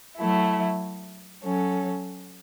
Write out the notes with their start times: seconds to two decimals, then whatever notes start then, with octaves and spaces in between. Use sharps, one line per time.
0.18 F#3 A3 E4
1.43 F#3 C#4 A4